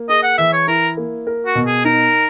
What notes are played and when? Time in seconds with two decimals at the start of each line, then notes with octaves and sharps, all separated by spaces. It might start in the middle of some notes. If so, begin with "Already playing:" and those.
Already playing: A#3
0.09 G#4 D#5
0.23 F#5
0.38 E3 E5
0.53 C#5
0.68 E4 A#4
0.97 A#3
1.27 A#4
1.46 F#4
1.55 B2
1.66 G#4
1.85 D#4 A#4